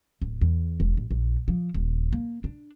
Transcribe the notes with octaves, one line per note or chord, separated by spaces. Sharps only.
D1
E2
E1
A1
A#1
F3
D#1
A#3
D4